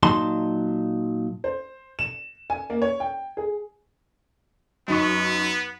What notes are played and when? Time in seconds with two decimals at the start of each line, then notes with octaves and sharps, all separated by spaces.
0.03 A#2 F#3 D#4 A5 C6
1.44 C5
1.99 E7
2.50 G#5
2.70 A#3
2.82 C#5
3.00 G5
3.37 G#4
4.88 F#2 B3 D#4 C#6